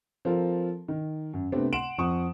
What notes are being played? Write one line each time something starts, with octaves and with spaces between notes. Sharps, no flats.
F3 C4 F4 A4 A#4
D#3
F#2
C3 A3 B3 C4 D4
F#5 C6 D7 E7 F#7
F2 F3 F#5 C#6 D#6